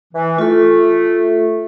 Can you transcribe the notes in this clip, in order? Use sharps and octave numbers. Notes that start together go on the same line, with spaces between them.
E3
A3 F4 A4